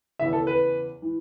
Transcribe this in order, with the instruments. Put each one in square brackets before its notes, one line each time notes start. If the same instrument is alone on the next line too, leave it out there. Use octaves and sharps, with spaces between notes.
[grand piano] E2 C#3 E3 E5
A4
B4
E3